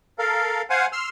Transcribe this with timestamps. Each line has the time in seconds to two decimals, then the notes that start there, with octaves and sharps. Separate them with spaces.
0.19 A4 A#4 F5
0.70 C5 F5 F#5 G#5
0.92 C6 E6 F6